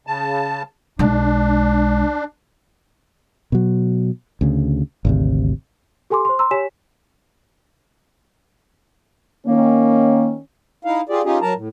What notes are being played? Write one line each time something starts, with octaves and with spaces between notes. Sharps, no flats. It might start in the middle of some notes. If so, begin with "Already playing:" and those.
C#3 A5
B1 G#3 D4
B2 F#3
D2 C#3
G#1 D2 C3
G4 A4 G#5 C6 D6
C5 C6
A#5 C6 E6
G4 C#5 G#5 B6 E7
D#3 A#3 C#4
D#4 E4 F5
F4 G4 G#4 D5
C#4 D#4 F4 G4 G#4
F#3 A#4 A5 A#5
A2